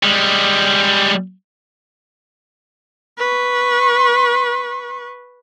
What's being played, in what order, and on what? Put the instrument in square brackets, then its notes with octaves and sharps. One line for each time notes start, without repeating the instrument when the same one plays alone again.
[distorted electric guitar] G3 G#3
[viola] B4 C#6